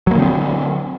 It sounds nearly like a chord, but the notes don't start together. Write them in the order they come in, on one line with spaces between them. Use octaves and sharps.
F#3 A#3 D3 C4